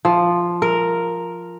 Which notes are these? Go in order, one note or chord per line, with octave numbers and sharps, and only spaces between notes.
F3
A#4